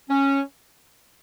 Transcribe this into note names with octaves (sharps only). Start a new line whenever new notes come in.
C#4